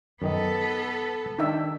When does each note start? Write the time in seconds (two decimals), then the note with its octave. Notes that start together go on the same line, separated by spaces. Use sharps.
0.22 F#2 D#3 B3 A4 D#5
1.39 D#3 D4 D#4 E5 G5